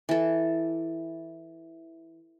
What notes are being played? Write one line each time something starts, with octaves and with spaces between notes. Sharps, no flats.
E3 A4